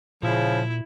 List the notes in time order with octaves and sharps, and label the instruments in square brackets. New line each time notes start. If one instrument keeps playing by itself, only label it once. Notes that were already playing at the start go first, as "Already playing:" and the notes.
[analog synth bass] A#2 [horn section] C#3 F3 [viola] E4